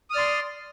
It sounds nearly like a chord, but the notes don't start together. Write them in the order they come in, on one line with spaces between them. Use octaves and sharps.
D#6 F6 D5 C6